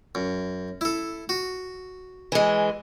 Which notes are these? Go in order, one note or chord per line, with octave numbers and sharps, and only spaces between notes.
F#2
E4 A4
F#4
E3 G#3